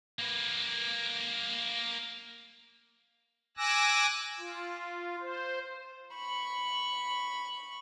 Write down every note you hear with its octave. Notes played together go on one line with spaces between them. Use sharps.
A#3 B4
G#5 D6 E6 F#6 A#6
F4
C5
B5 C#6